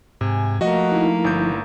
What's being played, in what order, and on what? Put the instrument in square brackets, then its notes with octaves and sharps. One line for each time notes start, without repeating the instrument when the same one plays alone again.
[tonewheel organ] G#2 G#5 [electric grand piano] C3
[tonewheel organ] F3 [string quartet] A3 A#3 [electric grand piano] F#4 D#5 F#5
[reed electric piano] D#4 E4
[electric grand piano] G1 G6